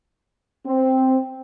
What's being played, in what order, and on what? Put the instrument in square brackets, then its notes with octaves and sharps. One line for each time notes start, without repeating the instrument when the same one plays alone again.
[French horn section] C4